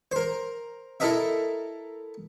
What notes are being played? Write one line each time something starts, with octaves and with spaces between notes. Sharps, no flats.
A#4 C5
E4 A4 A#4 D#5 E5